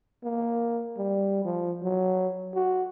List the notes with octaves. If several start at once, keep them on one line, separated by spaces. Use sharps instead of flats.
A#3
G3
F3
F#3
F#4